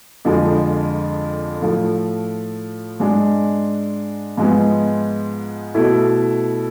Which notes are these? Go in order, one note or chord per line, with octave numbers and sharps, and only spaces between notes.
F2 D3 F3 G#3
A2 F3 A3
G#2 G#3 D4
G#2 F3 G#3 B3
B2 A3 E4